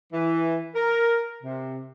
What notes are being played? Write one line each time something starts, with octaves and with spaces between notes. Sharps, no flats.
E3
A#4
C3